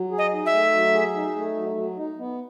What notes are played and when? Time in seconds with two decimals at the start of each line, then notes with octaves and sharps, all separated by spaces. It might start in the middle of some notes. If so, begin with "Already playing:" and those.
Already playing: F#3
0.11 G#4
0.18 D#5
0.33 D#4
0.46 E5
0.52 A3
0.73 F#3
0.94 G#4
1.15 D#4
1.36 A3
1.55 F#3
1.76 F#3
1.97 D#4
2.18 B3